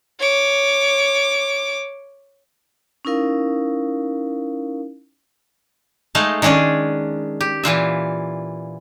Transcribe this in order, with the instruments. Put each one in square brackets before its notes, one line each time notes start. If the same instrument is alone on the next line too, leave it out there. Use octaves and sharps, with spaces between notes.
[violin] C#5 D6
[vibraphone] C#4 D#4 E4 A#4 F5
[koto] G#3 A3 D#4 F5
D#3 G#3 C#4 D4 G#4
G4
A#2 E3 F4 E5